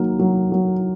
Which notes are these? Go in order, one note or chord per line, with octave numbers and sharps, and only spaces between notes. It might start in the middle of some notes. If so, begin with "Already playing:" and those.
Already playing: D#3 F#3 A#3
F#3
F#3